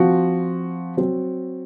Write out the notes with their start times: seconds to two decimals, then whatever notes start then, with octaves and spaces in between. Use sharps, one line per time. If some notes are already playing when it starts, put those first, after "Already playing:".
Already playing: F3 C4 F#4
0.97 F#3 C4 F#4